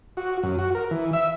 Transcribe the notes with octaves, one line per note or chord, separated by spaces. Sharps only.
F#4
F#2
F#4
A#4
E3
E5